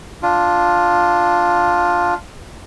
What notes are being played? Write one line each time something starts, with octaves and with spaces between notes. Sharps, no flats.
D4 F4